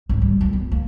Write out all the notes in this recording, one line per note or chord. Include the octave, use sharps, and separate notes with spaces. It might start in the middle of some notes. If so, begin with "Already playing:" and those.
G#1
G3
G2
B3
A#3